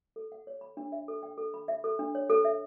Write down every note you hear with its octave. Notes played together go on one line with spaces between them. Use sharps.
A4
F#5
C#5
B5
D4
E5
A4
G5
A4
B5
E5
A4
D4
C#5
A4
E5